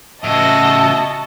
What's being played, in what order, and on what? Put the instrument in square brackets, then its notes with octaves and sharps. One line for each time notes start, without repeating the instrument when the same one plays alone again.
[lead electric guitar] A2 C#3 [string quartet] F#4 D#5 [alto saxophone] E5 [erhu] A5